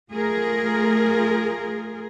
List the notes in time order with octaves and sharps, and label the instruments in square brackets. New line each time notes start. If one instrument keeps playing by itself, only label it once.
[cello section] A3 F4 G#4 A#4